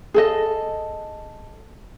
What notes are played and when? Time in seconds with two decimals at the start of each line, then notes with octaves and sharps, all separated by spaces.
0.14 G#4 A4 D#5